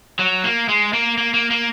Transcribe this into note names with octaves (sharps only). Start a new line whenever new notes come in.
F#3
A#3
G#3
A#3
A#3
A#3
A#3